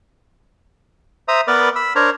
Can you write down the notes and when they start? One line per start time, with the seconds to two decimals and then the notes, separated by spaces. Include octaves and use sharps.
1.28 C5 E5 A#5 D#6
1.48 B3 A#4 B4 D5 D6
1.76 B5 E6
1.96 D4 A#4 C5 C#5 A#5